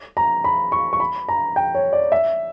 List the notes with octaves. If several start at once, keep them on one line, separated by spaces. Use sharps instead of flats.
A#5
B5
C#6
C#6
B5
A#5
G5
C#5
D5
E5